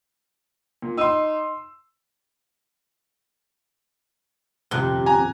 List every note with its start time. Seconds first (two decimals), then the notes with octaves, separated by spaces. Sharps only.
0.82 A#2
0.98 D#4 C6 E6
4.71 D#1 F2 C3 F#6 G7
5.06 G#5 A#5